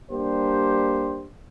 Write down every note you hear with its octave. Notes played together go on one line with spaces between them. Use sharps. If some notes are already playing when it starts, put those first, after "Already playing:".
G3 A#3 D4 G4 C5